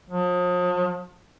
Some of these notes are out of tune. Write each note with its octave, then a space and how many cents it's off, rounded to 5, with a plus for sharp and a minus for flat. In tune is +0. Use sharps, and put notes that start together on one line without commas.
F3 +40